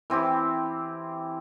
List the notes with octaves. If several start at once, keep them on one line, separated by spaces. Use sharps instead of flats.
E3 C4 E4 G4